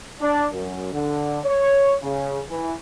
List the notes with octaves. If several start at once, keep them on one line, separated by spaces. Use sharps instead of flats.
D4
F#2
D3
C#5
C#3
E3